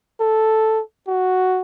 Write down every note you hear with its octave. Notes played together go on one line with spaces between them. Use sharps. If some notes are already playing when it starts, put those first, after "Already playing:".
A4
F#4